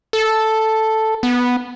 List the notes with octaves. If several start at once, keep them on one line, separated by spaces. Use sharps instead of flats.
A4
B3